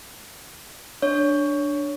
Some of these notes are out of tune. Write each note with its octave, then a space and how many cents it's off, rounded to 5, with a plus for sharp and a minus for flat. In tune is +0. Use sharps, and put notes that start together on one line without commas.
D4 +0 C#5 +15